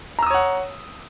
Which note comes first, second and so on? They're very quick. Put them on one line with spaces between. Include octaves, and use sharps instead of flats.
A#5 E6 D#6 C#5 F#5